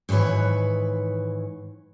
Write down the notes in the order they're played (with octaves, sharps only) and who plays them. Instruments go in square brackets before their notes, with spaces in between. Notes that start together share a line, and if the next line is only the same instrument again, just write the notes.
[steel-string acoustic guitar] G#2 D#3 E3 B4 C#5